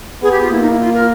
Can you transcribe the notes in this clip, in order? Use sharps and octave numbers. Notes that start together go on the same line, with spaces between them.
B3 G#4
G4
F4
A#3 E4
D#4
E4
F4
A#4